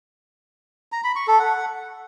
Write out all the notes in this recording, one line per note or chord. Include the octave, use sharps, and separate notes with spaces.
A#5
B5
C#6
A4
F#5